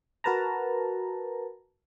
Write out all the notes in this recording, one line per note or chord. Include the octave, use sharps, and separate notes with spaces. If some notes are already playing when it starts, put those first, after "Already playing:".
F#4 A#4 B4 A5 A#5